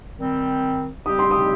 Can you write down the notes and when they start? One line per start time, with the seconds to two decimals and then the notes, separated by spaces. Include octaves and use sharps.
0.17 D#3 G3 C4
1.06 G3 C4 G4 D#6
1.19 C6
1.31 D#6